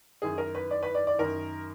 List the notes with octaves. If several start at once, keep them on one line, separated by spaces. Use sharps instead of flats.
F#2 D#3 G#4
A#4
B4
D5
B4
D5
D5
F#2 D#3 A#4